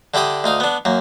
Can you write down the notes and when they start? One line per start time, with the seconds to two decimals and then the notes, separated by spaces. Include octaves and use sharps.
0.14 D3 E4 G4 D5 D#6
0.44 D2 D#4 F5
0.60 B3 D4
0.85 F#2 A#3